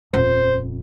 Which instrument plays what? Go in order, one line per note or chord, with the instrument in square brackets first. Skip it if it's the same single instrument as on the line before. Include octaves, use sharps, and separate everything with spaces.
[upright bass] D#1 F2 [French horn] C5